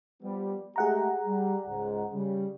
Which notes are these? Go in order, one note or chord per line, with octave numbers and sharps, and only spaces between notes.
F3 G3 B3
G#3 A3 G4 G#4 F#5 A#5
G3
C#2 G#2
C#3 G3